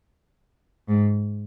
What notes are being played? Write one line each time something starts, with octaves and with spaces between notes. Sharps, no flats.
G#2